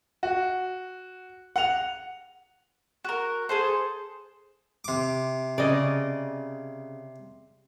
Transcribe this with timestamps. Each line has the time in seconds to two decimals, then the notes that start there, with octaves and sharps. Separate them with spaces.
0.23 F#4
1.56 F#5 F7
3.05 F#4 A#4
3.49 G#4 A4 C5
4.84 C3 D6
5.58 C#3 D5 D#5